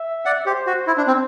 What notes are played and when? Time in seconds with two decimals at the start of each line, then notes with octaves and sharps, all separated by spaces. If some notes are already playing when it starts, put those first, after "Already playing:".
Already playing: E5
0.25 D5 F#5
0.46 G4 C5
0.67 F#4
0.87 E4 C5
0.97 D4
1.07 C4